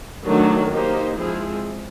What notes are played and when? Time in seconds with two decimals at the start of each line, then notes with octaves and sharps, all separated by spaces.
0.24 D#3 F#3 A3 D4 F#4
0.70 A#3 D#4 G4 C5
1.16 F3 G#3 C4 E4 G#4